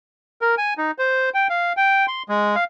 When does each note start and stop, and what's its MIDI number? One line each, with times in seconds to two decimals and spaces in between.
0.42 0.55 70
0.58 0.74 80
0.78 0.91 63
0.99 1.30 72
1.34 1.47 79
1.50 1.73 77
1.77 2.06 79
2.08 2.23 84
2.29 2.56 56
2.56 2.64 77